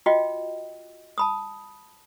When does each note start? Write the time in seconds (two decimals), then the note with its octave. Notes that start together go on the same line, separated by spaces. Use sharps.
0.06 F4 F#4 D#5 G5
1.18 A5 B5 D#6